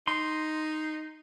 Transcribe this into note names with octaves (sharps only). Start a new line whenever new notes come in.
D#4 C6